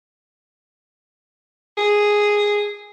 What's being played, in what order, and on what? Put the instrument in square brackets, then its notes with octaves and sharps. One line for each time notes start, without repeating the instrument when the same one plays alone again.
[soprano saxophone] G#4